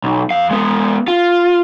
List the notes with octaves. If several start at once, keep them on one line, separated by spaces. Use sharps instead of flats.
B1
F2 F5
G#3 B3
F4